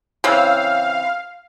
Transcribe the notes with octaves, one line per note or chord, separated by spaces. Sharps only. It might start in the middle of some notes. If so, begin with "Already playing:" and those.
C#3 E3 C4 F5